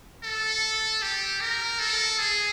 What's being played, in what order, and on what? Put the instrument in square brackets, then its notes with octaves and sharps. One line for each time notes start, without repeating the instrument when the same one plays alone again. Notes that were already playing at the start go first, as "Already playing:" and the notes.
[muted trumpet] A4
G4
A#4
A4
G#4